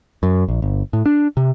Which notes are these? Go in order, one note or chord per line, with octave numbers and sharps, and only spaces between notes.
F#2
A#1
G1
A2
D4
C3